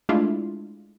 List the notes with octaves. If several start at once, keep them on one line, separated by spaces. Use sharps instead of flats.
G#3 A3 D4 E4 F4